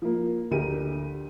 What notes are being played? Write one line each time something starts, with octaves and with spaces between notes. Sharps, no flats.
F3 A#3
D2 G4 A#4 D#7